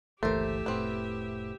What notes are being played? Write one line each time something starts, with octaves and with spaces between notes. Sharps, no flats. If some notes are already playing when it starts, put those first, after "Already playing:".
G1 C#2 E3 A3 A#3 G4 C5 E5
F1 A2 B3 C4